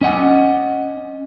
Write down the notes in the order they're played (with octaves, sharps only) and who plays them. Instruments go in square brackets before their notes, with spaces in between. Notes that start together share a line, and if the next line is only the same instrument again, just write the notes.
[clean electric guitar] C#4 D#5 F#5 G#5